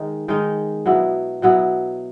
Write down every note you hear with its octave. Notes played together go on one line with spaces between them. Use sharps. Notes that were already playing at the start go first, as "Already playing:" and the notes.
Already playing: D#3 G#3 D#4
D#3 G#3 D#4
B2 F#3 B3 E4
B2 F#3 B3 E4